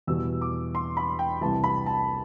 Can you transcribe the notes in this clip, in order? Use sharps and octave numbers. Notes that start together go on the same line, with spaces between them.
E2 B2 G3 E6
D6
C6
B5
G5
C2 C3 E3 A5
B5
A5